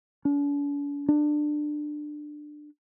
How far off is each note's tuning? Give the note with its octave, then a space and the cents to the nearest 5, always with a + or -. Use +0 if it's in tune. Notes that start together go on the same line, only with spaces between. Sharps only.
D4 -45
D4 +20